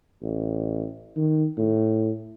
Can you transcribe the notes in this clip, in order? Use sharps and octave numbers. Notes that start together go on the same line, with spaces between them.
A1
D#3
A2